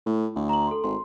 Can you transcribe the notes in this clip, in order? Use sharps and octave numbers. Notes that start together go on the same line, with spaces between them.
A2
D2
A#5 F#7
A4 C6
G#1 C6